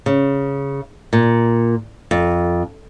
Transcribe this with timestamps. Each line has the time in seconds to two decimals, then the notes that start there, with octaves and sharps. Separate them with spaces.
0.06 C#3
1.13 A#2
2.11 F2